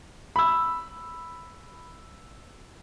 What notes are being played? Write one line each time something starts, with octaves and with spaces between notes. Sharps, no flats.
B5 E6